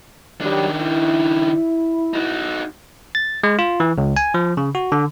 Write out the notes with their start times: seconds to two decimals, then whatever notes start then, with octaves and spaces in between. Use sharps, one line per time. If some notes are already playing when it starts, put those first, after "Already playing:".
0.41 D#3 F#3 G3 D4
0.81 E4
2.14 D#4 F#4
3.15 A6
3.43 G#3
3.59 F4
3.80 E3
3.98 C#2
4.17 G#5
4.34 F3
4.57 C#3
4.75 F#4
4.92 D3